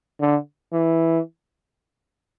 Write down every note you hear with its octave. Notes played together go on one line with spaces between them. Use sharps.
D3
E3